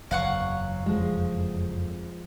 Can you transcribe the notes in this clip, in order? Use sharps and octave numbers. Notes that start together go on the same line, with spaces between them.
F#1 E2 F#3 F5 F#5 C#6
F2 F3 G#3